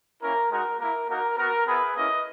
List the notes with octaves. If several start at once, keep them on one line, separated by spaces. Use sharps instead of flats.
A#3 C#4 E4 A#4
G#3 D#4 F#4 A#4
A#3 E4 A#4
A#3 D#4 F#4 A#4
B3 F#4 A#4
B3 E4 G#4 B4
A#3 C#4 E4 B4 D#5